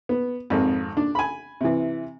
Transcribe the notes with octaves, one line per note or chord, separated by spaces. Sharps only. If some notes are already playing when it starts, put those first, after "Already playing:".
B3
G#1 F2
D4
G#5 B5
C3 E3